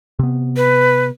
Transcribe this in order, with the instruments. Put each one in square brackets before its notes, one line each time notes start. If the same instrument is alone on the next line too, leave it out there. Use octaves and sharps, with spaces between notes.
[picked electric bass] C3 B3
[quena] B4